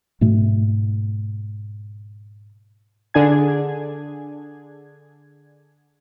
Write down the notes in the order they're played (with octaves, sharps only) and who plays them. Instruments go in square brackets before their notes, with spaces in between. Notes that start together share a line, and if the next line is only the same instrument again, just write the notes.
[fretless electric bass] G#2 B2 A3
[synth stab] D3 D4 G#4 G#6